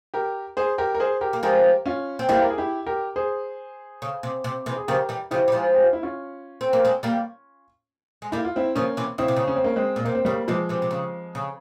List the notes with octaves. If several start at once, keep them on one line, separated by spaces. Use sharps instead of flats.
G4 A#4
G#4 C5
G4 A#4
A#4
G#4 C5
G4 A#4
A#3
F3 G#3 G4 A#4
C#4 F4
C4
G3 A#3 E4 G4
A#4
G#4
E4 G4
G4 A#4
G#4 C5
C#3
C3
C3
C3 E3
G#4
C#3 F3 G4 A#4
E3 G3
C#3 F3 E4 G4
G3
F3 G#3
G4
F4
E4
C#4 F4
C4
A#3
G#3 C4
G3 A#3
G#3
G3 A#3 E4
F4
C4 E4
C#3 F3 A#3 C#4
C3 E3
C#3 C4 E4
C3
C#3
C#4
C4
A#3 C#4
G#3 C4
A#2
C3 A#3
C4
C#3 G3 A#3
C3 E3 F3 G#3
C3 E3
C3
C#3
C#3